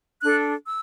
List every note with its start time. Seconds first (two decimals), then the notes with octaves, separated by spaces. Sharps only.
0.22 D4 A4 F#6
0.66 E6